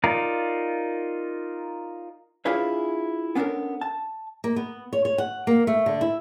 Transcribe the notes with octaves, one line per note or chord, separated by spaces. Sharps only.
D#4 F4 A#4 D5
D4 E4 F4 G#4 B4 C#5
B3 C#4 D4 F#4 A4 A#4
A5
A#3
B3
C#5
C#5
F#5
A#3
A3
D3
E4